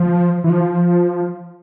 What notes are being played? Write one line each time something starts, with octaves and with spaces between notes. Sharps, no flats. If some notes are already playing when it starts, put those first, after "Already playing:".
Already playing: F3
E3
F3